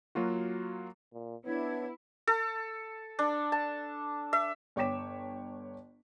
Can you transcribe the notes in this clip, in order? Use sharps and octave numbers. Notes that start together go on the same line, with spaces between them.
F#3 A#3 F4 F#4
A#2
B3 D4 E4 C#5 G#6
A4
D4
A5
E5
G1 C#5 G5 D6 B6 E7